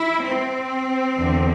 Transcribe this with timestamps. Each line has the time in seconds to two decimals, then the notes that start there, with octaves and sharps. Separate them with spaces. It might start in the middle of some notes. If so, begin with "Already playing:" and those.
Already playing: E4
0.24 C4
1.18 E2 D3